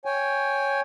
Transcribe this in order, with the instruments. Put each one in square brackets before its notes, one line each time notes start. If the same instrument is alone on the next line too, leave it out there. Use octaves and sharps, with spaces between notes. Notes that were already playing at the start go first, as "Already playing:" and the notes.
[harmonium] C#5 G5 G#5